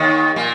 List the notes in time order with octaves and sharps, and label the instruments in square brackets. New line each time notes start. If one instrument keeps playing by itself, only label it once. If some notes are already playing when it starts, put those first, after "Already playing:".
Already playing: [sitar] D#2 D#3
A#2 A#3